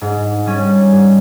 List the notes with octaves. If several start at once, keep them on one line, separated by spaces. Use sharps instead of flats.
G#2
G3 C#4
G#2